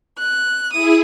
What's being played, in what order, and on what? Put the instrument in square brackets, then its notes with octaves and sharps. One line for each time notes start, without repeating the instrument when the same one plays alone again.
[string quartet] F#6
[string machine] E4 G#4 [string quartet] D#6